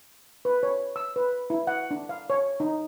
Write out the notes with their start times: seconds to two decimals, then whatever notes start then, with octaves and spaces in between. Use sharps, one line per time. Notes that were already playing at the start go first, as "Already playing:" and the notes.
0.45 B4
0.63 C#5
0.96 E6
1.16 B4
1.50 E4
1.67 F#5
1.91 D4
2.09 F5
2.30 C#5
2.60 D#4